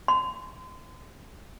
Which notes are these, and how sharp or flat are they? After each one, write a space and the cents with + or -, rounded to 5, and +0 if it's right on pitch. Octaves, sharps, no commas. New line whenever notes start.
C6 -30